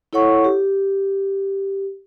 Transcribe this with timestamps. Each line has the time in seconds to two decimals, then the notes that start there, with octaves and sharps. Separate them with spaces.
0.13 E4 A4 C#5 F#5 C#6
0.44 G4